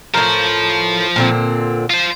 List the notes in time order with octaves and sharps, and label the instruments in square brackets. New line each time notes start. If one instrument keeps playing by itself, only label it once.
[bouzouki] A2 A#4 [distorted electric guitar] F3 C5
[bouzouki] A#2 D3 C4
[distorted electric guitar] F4 C5